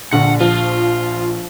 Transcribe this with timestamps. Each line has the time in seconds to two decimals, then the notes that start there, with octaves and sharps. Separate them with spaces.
0.13 A#1 D3 F#5
0.40 F3 F4